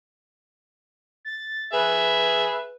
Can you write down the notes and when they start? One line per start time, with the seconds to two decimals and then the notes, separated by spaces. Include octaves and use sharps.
1.25 A6
1.73 G#4 B4 E5